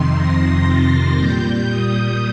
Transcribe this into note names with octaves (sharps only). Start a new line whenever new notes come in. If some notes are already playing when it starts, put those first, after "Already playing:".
Already playing: F2 C3 D#3 C6
A#6
A6
A#2 G3 G6
D#6